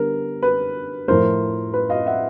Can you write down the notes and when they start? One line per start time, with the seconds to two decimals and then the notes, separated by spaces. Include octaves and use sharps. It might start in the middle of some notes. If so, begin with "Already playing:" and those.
Already playing: D3 G3 B3 A#4
0.42 B4
1.08 A2 F3 A3 A#4 C5
1.74 B4
1.90 D#5 F5
2.06 E5 F#5